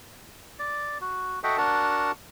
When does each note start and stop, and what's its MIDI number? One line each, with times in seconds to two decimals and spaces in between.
0.59 0.98 74
1.01 1.39 66
1.44 1.57 66
1.44 1.57 69
1.44 1.57 75
1.44 1.57 76
1.44 1.57 78
1.44 1.57 79
1.58 2.11 62
1.58 2.11 66
1.58 2.11 70
1.58 2.11 78
1.58 2.11 81